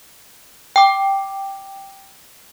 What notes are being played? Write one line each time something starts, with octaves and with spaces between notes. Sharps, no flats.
G5 D6